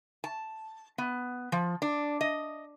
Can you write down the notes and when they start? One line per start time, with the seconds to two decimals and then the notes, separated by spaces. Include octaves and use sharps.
0.24 A5
0.98 B3
1.52 F3
1.82 D4
2.21 D#5